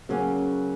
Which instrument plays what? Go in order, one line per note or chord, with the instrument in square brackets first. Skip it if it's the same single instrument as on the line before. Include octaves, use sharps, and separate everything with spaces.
[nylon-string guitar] C#3 F#3 A#3 C#4